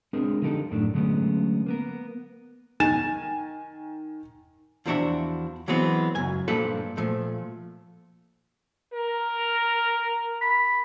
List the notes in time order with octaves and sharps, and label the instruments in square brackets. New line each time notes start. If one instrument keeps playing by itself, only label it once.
[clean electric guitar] G#3 C4 D4 G#4 A#4
D3 F3 D#4 G4 A4
F#2 A2 D#3 A3 D4
D3 F#3 G#3 A3 B3 C#4
A#3 B3 A#4
[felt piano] D#3 G#5 A6 E7
[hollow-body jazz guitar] E2 F3 G3 D4 F#4 E5
E3 F#3 G#3 B3 C4
C#2 F#2 G#5
G2 A#2 F3 A4 B4
A#2 F3 A3
[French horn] A#4
[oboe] B5